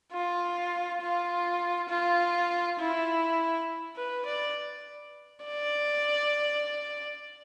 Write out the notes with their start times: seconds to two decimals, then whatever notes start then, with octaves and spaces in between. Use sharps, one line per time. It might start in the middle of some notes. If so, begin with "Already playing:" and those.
0.13 F4
1.02 F4
1.89 F4
2.79 E4
3.96 B4
4.26 D5
5.45 D5